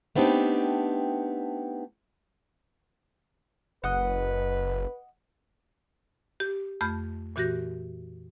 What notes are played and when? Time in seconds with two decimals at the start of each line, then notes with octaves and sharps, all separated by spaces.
0.15 A3 B3 C4 D4 D#4 G4
3.84 F#1 B4 D#5 F#5
6.40 G4
6.81 F2 A3 B5 F6 G6
7.36 A#2 E3 F#4 G4 G6 A#6